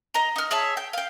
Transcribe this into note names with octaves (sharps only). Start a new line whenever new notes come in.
D#5 A#5
D#4 F6
G#4 C#5 E5 A5
G5
F5 G5